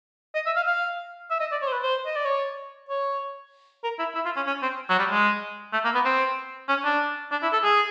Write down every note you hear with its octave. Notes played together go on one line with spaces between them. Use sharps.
D#5
E5
F5
F5
E5
D#5
D5
C#5
C5
B4
C5
D#5
D5
C#5
C#5
A#4
E4
E4
F4
C#4
C#4
C4
F#3
G3
G#3
A3
A#3
B3
C4
C#4
D4
D4
E4
A4
G#4